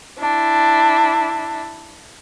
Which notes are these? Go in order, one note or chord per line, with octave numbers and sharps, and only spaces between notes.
D4 E4